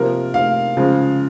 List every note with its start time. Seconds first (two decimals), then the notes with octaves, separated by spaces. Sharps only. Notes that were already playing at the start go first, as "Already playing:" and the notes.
Already playing: C3 F3 A#3 A#4
0.34 F5
0.77 C#3 F3 G#3